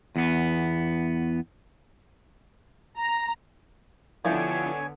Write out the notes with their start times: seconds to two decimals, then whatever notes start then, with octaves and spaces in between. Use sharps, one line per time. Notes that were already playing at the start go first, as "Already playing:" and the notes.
0.16 E2 B3
2.98 A#5
4.25 D3 F3 B3 E4 G4 C#5 G#5